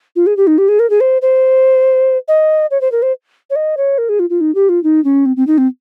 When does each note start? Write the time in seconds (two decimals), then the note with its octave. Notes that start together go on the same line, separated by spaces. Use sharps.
0.16 F4
0.27 G#4
0.37 G4
0.47 D#4
0.58 G4
0.68 G#4
0.79 A#4
0.90 G#4
1.00 C5
1.22 C5
2.28 D#5
2.71 C#5
2.81 C5
2.92 A#4
3.02 C5
3.50 C#5
3.56 D#5
3.77 C#5
3.98 A#4
4.09 G#4
4.19 F4
4.30 F4
4.41 D#4
4.55 G4
4.69 F4
4.83 D#4
5.04 C#4
5.26 C4
5.37 C4
5.47 D#4
5.58 C4